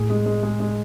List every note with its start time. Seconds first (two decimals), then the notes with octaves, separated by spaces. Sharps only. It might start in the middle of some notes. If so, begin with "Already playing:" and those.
Already playing: A2 G#4
0.10 G#3
0.26 G#3
0.43 G#3
0.60 G#3